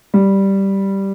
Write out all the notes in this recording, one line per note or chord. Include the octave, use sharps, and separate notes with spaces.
G3